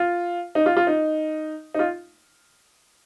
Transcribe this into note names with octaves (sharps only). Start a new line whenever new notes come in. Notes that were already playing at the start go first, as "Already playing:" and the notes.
Already playing: F4
D#4
F4
F4
D#4
D#4
F4